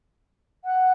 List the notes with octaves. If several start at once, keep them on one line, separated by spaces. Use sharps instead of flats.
F#5